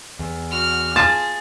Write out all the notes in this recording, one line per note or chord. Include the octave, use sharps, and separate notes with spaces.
E2
F#4 F6
F4 G#4 A5 A6